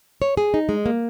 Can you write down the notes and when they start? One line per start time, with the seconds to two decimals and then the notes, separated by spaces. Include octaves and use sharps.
0.22 C#5
0.37 G#4
0.54 D#4
0.69 G#3
0.86 A#3